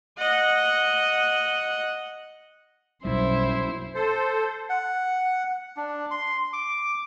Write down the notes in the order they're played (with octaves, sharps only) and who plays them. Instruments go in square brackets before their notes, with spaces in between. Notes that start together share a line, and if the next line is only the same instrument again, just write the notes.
[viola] D#5 F#5
[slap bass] B1 G3 [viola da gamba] F#2 E4 C5
[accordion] A4 C5
[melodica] F#5
D4
C6
D6